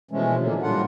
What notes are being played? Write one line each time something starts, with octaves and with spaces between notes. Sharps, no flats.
B2 E3 F3 G#3 A3 C#4
A#2 D3 F#3 A#3
A2 G3 D4 F4 F#5